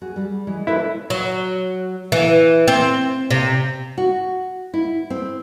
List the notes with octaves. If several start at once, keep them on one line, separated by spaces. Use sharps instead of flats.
F#4 G#4
G3 G#4
E3 G#3
E4 A4 B4 C5
F#3
E3
C4
C3
F#4
E4
C4